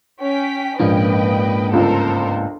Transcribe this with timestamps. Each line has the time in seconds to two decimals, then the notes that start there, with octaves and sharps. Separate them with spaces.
0.21 C#4 G5 B6
0.80 A#1 G#2 A#3 C#4 B4 D#5 G5
1.73 G1 C#2 A4 A#4 C5